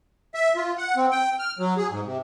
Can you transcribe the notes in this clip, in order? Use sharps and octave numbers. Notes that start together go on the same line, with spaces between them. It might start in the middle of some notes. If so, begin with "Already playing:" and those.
E5
F4
F#5
C4
G5
F6
F#3
G#4
G#2
C3